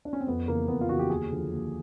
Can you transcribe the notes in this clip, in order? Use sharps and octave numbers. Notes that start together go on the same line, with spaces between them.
D4
C#4
C4
F2 B3
C#3 E3 A#3
F2 B3
F4
C#3 E3 F#4
G4
D#2 G#4
D3 F3
D#2